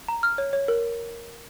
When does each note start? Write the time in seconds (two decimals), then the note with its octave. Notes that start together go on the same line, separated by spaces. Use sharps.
0.08 A#5
0.23 F6
0.38 C#5
0.53 C#5
0.68 A#4